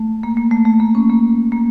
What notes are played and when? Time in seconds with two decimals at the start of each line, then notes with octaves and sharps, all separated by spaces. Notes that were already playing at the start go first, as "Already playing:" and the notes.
Already playing: A3
0.23 A#3
0.37 A#3
0.51 A3
0.65 A3
0.80 A#3
0.95 C#4
1.09 A#3
1.52 A#3